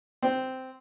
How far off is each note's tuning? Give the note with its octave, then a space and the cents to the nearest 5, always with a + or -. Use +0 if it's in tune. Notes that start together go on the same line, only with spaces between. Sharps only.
C4 -10